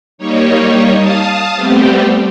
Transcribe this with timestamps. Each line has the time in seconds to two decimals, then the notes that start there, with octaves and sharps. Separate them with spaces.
0.18 G3 A#3 D#4 C#5
0.97 F5 A5 D#6
1.56 G3 A3 B3 C4 G4